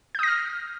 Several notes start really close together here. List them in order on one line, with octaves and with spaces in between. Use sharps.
G6 D#6 A#6 F6